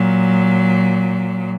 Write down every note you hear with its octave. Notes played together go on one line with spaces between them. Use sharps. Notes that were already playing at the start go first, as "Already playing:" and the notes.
Already playing: A#2 F#3